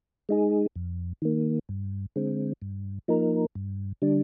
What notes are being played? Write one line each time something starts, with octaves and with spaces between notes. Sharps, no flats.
G#3 D#4 G#4
F2
D#3 A#3
G2
D3 G#3 C4
G2
F3 A#3 D#4 A#4
G2
D3 G3 D4